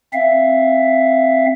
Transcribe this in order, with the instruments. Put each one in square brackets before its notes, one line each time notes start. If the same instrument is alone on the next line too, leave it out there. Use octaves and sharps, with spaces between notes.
[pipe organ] C4 E5 F5